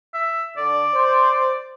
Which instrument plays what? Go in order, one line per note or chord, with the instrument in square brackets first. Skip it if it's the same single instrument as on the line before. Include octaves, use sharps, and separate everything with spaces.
[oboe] E5
[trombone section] D3 [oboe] D5
[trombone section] C5